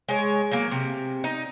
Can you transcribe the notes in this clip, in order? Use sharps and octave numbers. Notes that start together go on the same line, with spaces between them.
G#3 C#5
F#3 A#3
C3
D#4